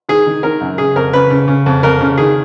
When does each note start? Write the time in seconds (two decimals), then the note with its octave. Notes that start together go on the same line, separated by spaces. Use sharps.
0.09 D#3 G#4
0.26 D#3
0.43 D#3 A#4
0.61 F#2
0.78 C#3 G#4
0.95 F2 A#4
1.13 C#3 B4
1.30 C#3
1.48 C#3
1.66 F2
1.83 F2 A#4
2.01 C#3
2.18 D#3 G#4